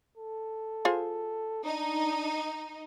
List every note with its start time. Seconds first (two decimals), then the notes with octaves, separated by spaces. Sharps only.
0.18 A4
0.85 F4 G#4 C5
1.65 D4 D#4